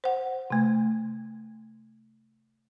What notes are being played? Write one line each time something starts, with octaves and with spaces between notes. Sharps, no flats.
C5 F#5
C3 A3